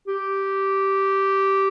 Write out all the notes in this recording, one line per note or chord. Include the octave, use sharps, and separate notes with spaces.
G4